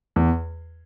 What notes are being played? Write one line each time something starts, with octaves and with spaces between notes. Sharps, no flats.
E2